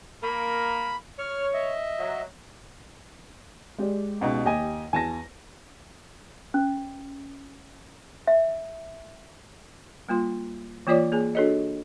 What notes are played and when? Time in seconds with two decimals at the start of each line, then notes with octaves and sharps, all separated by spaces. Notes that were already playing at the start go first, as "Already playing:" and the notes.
0.23 A#3 A#4 B5
1.19 C#5 F6
1.53 D#5 E5
1.99 F#3
3.79 G#3 G4 D5
4.21 C#2 B2 D#4
4.45 D#2 G4 D#5 G#5
4.93 E2 G#5 A5 A#6
6.54 C#4
8.27 E5
10.09 G3 A#3 F4 C6
10.87 E3 A#3 F4 C#5 D5 D6
11.12 A#3 G#4 G#5
11.35 D4 F#4 A4 C#5 D#5